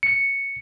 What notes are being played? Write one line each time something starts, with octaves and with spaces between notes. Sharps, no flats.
C#7